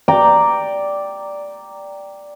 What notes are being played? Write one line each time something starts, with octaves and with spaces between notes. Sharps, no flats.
D5 G5 A#5